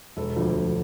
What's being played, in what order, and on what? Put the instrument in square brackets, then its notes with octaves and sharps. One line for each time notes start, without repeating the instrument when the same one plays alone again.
[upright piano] E1 A4
D2 D3 F3
E1